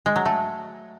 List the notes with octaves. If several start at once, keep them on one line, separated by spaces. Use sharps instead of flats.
G#3
F#3
A3